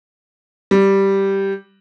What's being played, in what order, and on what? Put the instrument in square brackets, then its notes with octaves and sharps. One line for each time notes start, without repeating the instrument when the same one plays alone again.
[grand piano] G3